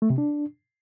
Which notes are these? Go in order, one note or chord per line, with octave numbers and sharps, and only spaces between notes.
A3
C3
D4